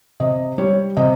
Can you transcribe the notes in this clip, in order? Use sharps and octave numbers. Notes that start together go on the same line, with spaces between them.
C3 D#5
G3 C#5
C3 D#5